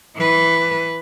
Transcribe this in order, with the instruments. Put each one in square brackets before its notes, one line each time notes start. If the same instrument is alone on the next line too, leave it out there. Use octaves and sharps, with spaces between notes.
[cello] E3 B4